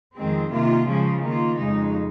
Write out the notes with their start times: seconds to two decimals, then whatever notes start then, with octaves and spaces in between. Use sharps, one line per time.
0.16 F2 D#3 G#3 C4
0.51 C3 D#3 A#3 F4
0.86 C#3 F3 G#3 C#4
1.22 D#3 A#3 F4
1.57 F2 C#3 G#3 D#4